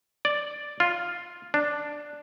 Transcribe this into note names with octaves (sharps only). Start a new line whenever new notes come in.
D5
F4
D4